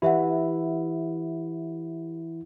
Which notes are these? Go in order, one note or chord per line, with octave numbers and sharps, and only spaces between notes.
E3 E4 G4 E5 F#5